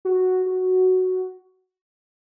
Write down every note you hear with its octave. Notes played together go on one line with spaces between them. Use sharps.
F#4
F#4